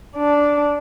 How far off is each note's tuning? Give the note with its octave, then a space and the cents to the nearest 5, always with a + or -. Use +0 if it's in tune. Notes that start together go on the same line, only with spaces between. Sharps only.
D4 -10